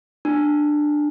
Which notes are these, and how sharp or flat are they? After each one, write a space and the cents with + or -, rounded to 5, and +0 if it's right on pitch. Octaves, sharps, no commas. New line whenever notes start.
D4 +15